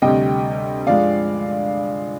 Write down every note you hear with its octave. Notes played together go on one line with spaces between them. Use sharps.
D2 C3 G3 D#5 G5
G2 F3 G#3 D5 F5